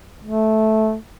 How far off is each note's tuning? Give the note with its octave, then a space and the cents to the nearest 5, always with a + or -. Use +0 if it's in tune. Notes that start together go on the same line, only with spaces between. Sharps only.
A3 -10